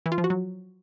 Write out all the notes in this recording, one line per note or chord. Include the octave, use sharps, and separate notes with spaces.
E3
F4
F3
F#4
F#3